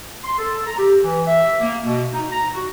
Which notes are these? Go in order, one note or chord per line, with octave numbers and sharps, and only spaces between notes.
C6
A4
A#5
G4
E3
E5
A#3
B2
D#4
A#5
F#4